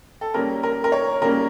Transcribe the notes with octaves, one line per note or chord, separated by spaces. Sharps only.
A4
C#3 G3 A#3 C#4 A#4
A#4
A#4
C#5
C#3 G3 A#3 C#4 A#4